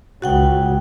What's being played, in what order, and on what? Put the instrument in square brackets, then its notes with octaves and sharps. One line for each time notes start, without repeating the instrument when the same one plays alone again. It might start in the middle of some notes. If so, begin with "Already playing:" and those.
[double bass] C#2 C#3 [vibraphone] F#4 F#5 G5